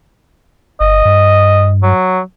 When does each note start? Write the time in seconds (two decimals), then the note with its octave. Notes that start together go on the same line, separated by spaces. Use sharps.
0.80 G1 D#5
1.05 G2
1.83 F#3